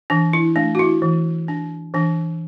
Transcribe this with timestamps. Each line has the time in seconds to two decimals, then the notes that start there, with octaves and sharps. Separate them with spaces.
0.10 E3 D4
0.33 E4
0.56 A3 D4
0.75 F#4
0.79 E4
1.02 E3
1.48 D4
1.94 E3 D4